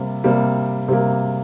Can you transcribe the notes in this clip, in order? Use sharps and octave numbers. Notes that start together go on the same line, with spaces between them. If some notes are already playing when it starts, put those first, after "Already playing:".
Already playing: C3 G3 A#3
C3 G3 A#3
C3 G3 A#3